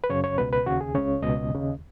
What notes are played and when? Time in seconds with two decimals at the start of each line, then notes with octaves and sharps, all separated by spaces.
0.04 B4
0.10 F#2 C#3 C#5
0.24 C#5
0.38 C#2 B2 B4
0.53 B4
0.66 D#2 C#3 F#4
0.81 G#4
0.95 C#2 C#3 C#5
1.23 C#2 B2 D#5
1.51 D#2 C#3